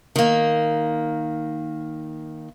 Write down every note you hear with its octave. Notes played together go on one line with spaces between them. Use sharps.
D#3 A#3